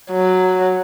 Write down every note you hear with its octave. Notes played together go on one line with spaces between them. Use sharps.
F#3